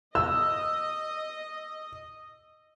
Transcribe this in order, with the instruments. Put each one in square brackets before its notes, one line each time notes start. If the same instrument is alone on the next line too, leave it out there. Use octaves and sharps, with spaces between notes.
[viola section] D#5 [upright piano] E6